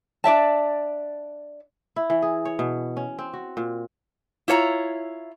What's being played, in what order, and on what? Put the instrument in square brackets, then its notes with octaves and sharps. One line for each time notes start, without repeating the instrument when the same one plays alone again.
[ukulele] D4 D5 E5 A5
[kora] E4
E3
G#4
C#5
B2
C#4
C4
F#4
A#2
[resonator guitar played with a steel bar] E4 F4 C#5 A5 A#5